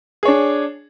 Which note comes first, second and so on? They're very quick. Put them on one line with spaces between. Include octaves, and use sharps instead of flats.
G#4 C#5 D4